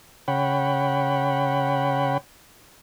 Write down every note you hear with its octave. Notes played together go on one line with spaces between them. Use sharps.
C#3 C#5 F#5 G5 B5